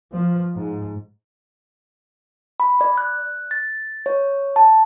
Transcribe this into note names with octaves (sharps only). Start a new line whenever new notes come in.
F3
G#2
B5
D5
F#6
A6
C#5
A5